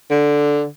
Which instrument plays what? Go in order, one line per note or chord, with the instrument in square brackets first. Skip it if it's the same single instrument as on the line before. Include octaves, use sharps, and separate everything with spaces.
[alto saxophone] D3